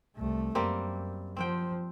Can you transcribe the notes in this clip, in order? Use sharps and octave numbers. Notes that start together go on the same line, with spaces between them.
C2 A3
F#2 G3 A#3 C4
F3 C4 C5 G5